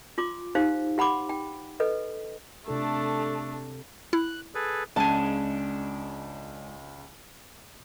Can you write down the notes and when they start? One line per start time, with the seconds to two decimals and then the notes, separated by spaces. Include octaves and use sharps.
0.18 F4 C6 D6
0.55 D#4 G4 C5 F5
0.98 G4 F#5 B5 C6 D6
1.29 G5
1.80 A4 B4 D#5
2.68 C3 A3 D4 A4
4.13 E4 F#6
4.55 G#4 A4 B4
4.96 C#2 G#3 C#4 D4 G#5 A5